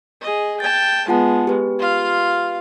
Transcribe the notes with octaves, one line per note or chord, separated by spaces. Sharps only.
G#4 D#5
G5 A5 G#6 A6
G#3 B3 F4 F#5 A5
G4 B4
F4 F5